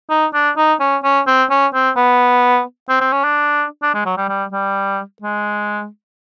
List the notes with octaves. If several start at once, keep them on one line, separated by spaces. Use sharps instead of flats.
D#4
D4
D#4
C#4
C#4
C4
C#4
C4
B3
C4
C4
C#4
D4
D4
G#3
F#3
G3
G3
G3
G#3